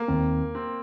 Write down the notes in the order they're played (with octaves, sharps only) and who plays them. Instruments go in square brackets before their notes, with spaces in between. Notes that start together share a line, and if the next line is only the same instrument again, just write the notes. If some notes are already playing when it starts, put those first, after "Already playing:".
Already playing: [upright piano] A#3
[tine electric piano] D#2 D#3 C4
[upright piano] C4